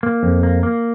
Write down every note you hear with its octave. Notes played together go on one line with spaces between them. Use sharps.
A#3
F2
A#3
A#3